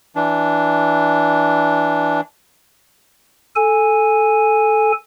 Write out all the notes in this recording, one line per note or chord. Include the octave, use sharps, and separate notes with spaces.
E3 D4
A4 G#5